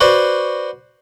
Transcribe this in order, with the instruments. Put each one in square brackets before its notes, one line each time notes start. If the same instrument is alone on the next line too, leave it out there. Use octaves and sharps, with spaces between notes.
[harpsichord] F#4 B4 C5 D5